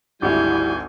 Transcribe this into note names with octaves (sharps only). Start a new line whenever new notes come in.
G#1 D2 G3 E4 G#5 G6